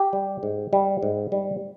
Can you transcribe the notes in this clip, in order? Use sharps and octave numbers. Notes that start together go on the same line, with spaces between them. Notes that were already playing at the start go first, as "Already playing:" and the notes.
Already playing: G4
G3
G#2
G3
G#2
G3